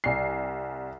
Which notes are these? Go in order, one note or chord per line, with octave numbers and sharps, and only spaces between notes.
C2 G#5 C7